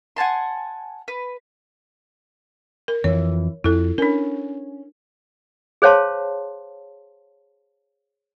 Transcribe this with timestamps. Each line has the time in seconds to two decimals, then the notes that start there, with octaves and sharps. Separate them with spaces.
0.16 F#5 G#5 A5 C6
1.08 B4
2.88 A#4
3.04 F2 E3 C#5
3.64 F2 E4 A4
3.98 C#4 D4 A#4
5.82 G#4 C5 C#5 F5 A5 C6